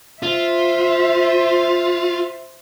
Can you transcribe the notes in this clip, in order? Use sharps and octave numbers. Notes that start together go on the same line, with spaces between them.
F4 C5 E5